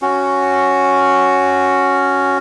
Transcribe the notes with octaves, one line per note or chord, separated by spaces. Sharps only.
C#4 F#4